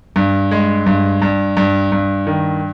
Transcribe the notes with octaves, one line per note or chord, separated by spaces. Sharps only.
G2
G#3
G2
G2
G2
G2
D#3